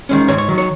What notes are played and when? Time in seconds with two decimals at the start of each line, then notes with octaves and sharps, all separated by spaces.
0.09 D#3 G#3 C#4
0.28 G#2 C#5
0.38 C#5
0.48 D#3 F#3
0.58 C#5